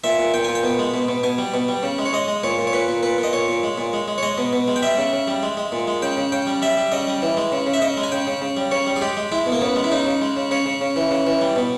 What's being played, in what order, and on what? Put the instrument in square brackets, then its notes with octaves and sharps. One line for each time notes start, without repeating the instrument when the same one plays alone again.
[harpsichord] A#2 E5
A#2
A#2 G5
A#2 G#5
G5
B2
G#3
B2
B2
B2 G#5
G3
B2
G3
C#3
G#3
C#5
G#3 D#5
G#3
A#2 C#5
A#2
C#5
A#2 B4
A#2
A#2 B4
A#2
D#5
A#2 C#5
A#2
G#3
A#2
G#3
G#3
C#5
G#3 D#5
B2
B2
G#3
G5
G3 E5
C#3
C#3
G3
G#3
G#3
A#2
G#3
C#3 G5
C#3
C#3 G5
G3
G3 E5
G3
C#3 D#5
G3
E3
G#3
C#3
C#3
E5
C#3 D#5
G#3
G#5
C#3 G5
C#3
C#3
G3
C#3 C#5
G3
G#4
G#3 G4
G#3
G#3 E4
B2
A#3
C#3 B3
G#3
E4
C#3 D#4
C#3
G#3
C#3
C#3 C#5
C#3
C#3
E3
C#3
E3
G3
B2